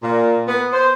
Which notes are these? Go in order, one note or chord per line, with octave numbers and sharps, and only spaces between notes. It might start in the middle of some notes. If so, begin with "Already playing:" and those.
A#2
B3
C5